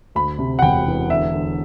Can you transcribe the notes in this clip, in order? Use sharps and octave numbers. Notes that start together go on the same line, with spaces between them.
D2 B5
C3
F#5
E1 G5
E3
D3 E5
D3